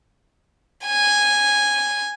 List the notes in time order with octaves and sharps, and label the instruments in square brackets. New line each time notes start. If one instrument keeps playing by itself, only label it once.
[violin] G#5